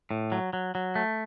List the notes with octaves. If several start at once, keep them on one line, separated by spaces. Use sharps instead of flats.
A2
F#3
F#3
F#3
A3